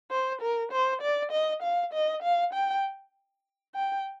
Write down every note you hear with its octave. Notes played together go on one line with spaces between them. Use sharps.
C5
A#4
C5
D5
D#5
F5
D#5
F5
G5
G5